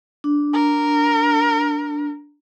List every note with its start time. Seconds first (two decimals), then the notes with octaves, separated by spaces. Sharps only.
0.24 D4
0.53 A#4